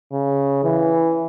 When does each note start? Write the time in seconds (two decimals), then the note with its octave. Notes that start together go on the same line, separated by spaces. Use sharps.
0.12 C#3
0.64 E3